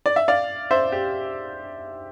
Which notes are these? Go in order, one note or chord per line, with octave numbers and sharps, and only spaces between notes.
D5
E5
D5 F5
C5 E5
G4